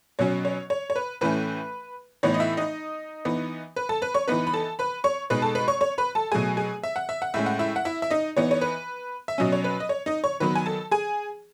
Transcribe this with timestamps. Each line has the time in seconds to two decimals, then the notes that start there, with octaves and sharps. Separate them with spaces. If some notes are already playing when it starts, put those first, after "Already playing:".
0.19 B2 F#3 C#4 C#5
0.45 C#5
0.70 C#5
0.90 C#5
0.96 B4
1.21 A2 E3 A3 C#4 B4
2.23 A2 E3 B3 D#4 C#5
2.34 D#5
2.40 E4 E5
2.57 D#4 D#5
3.25 E3 B3 D#4
3.76 B4
3.89 A4 A5
4.02 B4 B5
4.14 C#5 C#6
4.28 E3 B3 D#4 B4 B5
4.47 B5
4.53 A4 A5
4.79 B4 B5
5.04 C#5 C#6
5.30 B2 G#3 D#4 B4 B5
5.42 A4 A5
5.55 B4 B5
5.68 C#5 C#6
5.81 C#5 C#6
5.98 B4 B5
6.15 A4 A5
6.32 B2 F#3 A3 G#4 G#5
6.57 G#4 G#5
6.83 E5
6.96 F#5
7.09 E5
7.22 F#5
7.34 A2 G#3 C#4 E5
7.46 F#5
7.59 E4 E5
7.76 F#5
7.85 E4 E5
8.02 E5
8.11 D#4 D#5
8.37 E3 B3 D#4 C#5
8.51 C#5
8.61 B4
9.28 E5
9.38 B2 F#3 C#4 D#5
9.52 C#5
9.64 B4
9.80 D#5
9.89 C#5
10.06 D#4 D#5
10.24 C#5 C#6
10.40 D#3 F#3 B3 B4 B5
10.55 G#5
10.66 A4 A5
10.91 G#4 G#5